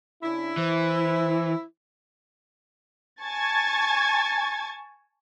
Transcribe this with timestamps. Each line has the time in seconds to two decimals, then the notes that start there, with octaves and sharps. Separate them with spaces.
0.23 C#3 C#4 D4 E4
0.57 E3 C5
3.23 G#5 A5 C#6 G#6 A6